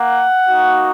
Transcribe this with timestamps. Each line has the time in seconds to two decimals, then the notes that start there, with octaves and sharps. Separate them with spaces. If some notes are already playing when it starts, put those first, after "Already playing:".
Already playing: A#3 F#5
0.47 A#3 D#4 F#4